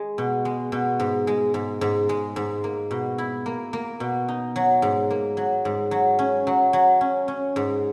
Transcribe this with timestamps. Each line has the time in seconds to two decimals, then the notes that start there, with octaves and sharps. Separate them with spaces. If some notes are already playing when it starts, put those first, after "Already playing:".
Already playing: G#3
0.18 B2
0.45 G#3
0.72 B2
0.99 G#2
1.27 G#3
1.54 G#2
1.81 G#2
2.09 G#3
2.36 G#2
2.64 A#3
2.91 B2
3.18 E4
3.46 A#3
3.73 A#3
4.00 B2
4.28 D#4
4.56 F#3
4.82 G#2
5.10 A#3
5.37 F#3
5.65 G#2
5.91 F#3
6.19 C#4
6.47 F#3
6.73 F#3
7.01 C#4
7.28 C#4
7.56 G#2